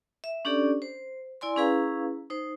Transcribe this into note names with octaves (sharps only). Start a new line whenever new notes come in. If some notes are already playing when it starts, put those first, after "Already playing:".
E5
C#4 D4 G4 A4 D5
C5
E4 D5 G#5 C6
C#4 E4 G#4 B4 F5 A#5
D#4 C5